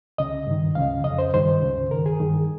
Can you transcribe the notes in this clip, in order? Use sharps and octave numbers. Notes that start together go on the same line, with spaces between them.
C#2 C#3 D#5
G2 D#3
C#2 C#3 F5
F2 C#3 D#5
C5
G2 D#3 C5
C#2 C#3
G2 D#3 A#4
G#4
G2 D#3